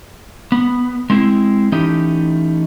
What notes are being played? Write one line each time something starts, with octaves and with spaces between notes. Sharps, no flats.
B3
G#3 A3 C4 E4 G#4
E3 A3 C#4 D#4 G4 D#5